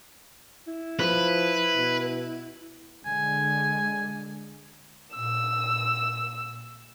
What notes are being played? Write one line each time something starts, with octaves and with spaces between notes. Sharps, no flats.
E4
F3 B4
B2
D3 G#3 G#5
A#2 E6